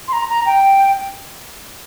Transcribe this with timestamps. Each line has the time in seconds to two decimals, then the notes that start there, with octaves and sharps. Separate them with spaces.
0.08 C6
0.13 A#5
0.29 A#5
0.46 G5